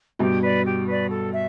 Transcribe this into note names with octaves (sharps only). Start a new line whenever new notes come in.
G2 B2 G4
B4 D5
G4
B4 D5
A4
E5